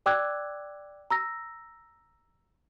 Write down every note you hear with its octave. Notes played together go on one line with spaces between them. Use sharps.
D5 G5 D6 E6 F#6 G#6
A#5 E6 A#6